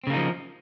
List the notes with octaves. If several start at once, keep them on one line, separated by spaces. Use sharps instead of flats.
C#3 F3 A#3 C4 D#4